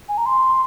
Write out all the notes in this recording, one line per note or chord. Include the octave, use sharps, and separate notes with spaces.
G#5
A#5
C6